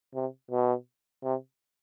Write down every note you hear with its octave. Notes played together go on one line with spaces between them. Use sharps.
C3
B2
C3